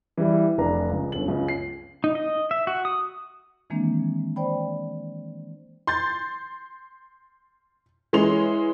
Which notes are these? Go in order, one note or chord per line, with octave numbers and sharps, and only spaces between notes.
E3 G3 E4
F1 D4 B4 A#5
C#2 C#3
G1 F#2 F#7
C#2 C#3
C7
D#4
D#5
E5
F#4
D#6
D#3 E3 G#3 A#3 C4 D4
C5 D5 G5 B5
C6 G6 A6
E3 G#3 C#4 C6 F7